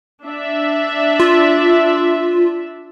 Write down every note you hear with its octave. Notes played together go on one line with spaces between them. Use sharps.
D4 E5
F4